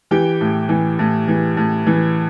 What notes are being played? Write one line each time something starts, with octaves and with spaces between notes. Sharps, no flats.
E3 G4 G5
A2
E3
A2
E3
A2
E3